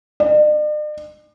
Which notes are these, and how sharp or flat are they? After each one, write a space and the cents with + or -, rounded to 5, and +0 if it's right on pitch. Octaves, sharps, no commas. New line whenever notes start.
D5 +45